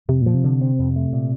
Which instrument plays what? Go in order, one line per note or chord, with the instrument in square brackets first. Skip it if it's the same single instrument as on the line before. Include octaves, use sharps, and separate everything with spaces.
[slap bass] F2 [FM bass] C3
[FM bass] A#2 [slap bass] F3
[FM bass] C3
[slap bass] D3
C4
F2
A3
A#2